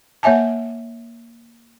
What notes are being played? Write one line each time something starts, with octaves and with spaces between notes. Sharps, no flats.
A#3 C#5 E5 G#5 A5